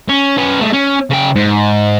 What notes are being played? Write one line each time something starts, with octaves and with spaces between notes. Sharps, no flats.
C#4
C#4 B4
G#3 A3
C#4
C#3 G5
G#2